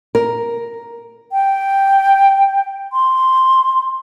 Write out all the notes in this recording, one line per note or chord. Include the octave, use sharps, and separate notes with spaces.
A#4
G5
C6